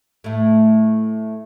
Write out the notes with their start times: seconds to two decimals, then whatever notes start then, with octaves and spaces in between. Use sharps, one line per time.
0.24 A2 A3